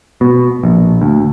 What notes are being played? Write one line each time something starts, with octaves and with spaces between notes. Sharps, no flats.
B2
A#1
D2